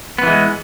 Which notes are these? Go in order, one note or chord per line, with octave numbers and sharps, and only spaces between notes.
E3 G#3 B3